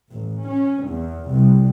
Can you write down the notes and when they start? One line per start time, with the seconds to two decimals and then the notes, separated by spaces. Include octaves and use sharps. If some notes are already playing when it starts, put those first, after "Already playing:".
0.10 A1
0.44 C#4
0.86 E2
1.29 C2